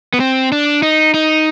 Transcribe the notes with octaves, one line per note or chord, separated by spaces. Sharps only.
B3
C4
D4
D#4
D#4